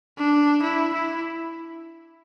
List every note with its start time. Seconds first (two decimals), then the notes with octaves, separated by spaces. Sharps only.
0.18 D4
0.62 E4
0.93 E4